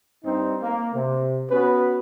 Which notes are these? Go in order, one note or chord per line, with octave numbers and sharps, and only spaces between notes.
G2 C4 D#4
A#3
C3
B3 C#4 F#4 B4